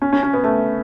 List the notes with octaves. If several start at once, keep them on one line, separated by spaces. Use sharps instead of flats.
C#4
C#4
C#4
B3
A3